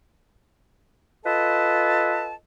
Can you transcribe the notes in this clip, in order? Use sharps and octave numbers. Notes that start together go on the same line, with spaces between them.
F4 A4 B4 D#5 A5